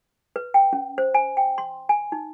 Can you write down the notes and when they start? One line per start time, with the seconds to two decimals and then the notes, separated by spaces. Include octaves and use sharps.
0.36 B4
0.54 G5
0.73 C#4
0.98 C5
1.14 G#5
1.37 G5
1.58 C6
1.89 G#5
2.12 D#4